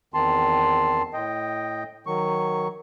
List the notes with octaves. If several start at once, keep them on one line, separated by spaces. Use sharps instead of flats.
E2 D#3 C4 A5 C6
A2 D#5 G5
D#3 F#3 C#6